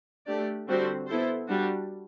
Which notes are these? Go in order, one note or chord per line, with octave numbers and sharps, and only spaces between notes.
A3 D4 G4 D5
D3 G3 C4 F#4 C5
B3 E4 A4 C5
G3 D4 F#4